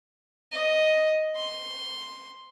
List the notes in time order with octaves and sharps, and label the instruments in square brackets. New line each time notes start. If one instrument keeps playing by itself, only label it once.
[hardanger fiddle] D#5
C6